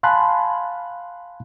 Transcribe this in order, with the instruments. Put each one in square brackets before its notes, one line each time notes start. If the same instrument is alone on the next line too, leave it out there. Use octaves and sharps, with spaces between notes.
[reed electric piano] F5 G#5 A5 B5 C6 F#6